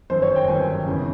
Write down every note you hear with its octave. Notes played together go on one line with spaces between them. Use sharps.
G1 F#2 D#3 C5
C#5
G5
G1 F#2 D#3 G#5
E2 C#3